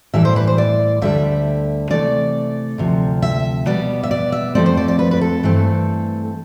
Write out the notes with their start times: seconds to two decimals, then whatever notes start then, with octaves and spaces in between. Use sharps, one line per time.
0.14 A2 E3 G3 E5
0.25 C5
0.36 B4
0.47 C5
0.58 D5
1.02 D2 D3 G3 E5
1.90 C3 E3 A3 D5
2.78 D2 C3 F3
3.22 E5
3.66 B2 G3 B3 D5
4.03 E5
4.11 D5
4.32 E5
4.55 F2 D3 F3 A3 C4 D5
4.66 C5
4.77 D5
4.88 D5
4.99 B4
5.11 B4
5.21 A4
5.43 G2 E3 A3 C4